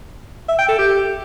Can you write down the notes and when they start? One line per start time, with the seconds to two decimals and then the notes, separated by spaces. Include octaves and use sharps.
0.49 E5
0.59 G5
0.69 A4
0.78 G4